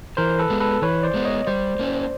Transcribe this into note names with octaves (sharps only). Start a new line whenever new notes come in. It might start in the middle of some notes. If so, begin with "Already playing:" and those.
E3 A#4 C5
A4 B4
G#3 B3
A4 B4
E3 B4 C#5
C5 D5
G#3 B3
C#5 D#5
G3 C5 D5
A#3 C#4